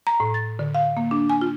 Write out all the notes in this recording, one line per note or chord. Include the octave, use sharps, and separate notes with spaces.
A#5
A2
A6
D3
F5
A#3
D4
G#5
F4